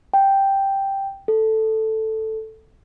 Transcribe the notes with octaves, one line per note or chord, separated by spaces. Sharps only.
G5
A4